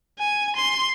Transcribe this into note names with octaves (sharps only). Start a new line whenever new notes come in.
G#5
C6